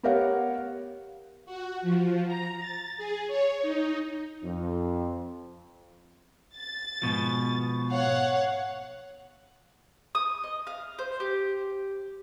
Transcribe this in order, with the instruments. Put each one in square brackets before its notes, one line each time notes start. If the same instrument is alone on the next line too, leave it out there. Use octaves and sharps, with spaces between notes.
[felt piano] B3 G4 A#4 C#5 F5 F#5
[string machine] F#4
F3
A#5
A6
G#4
C#5
D#4
[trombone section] F2
[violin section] A6
[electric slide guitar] G#2 B2 F3
[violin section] C#5 F5 F#5
[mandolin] D#6
D#5
F5
C5
G4